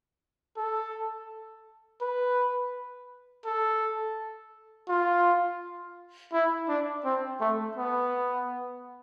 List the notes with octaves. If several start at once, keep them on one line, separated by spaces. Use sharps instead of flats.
A4
B4
A4
F4
E4
D4
C4
A3
B3